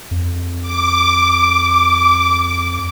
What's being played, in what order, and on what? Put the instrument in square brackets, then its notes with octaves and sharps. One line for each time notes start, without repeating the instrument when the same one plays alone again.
[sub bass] F2
[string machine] D6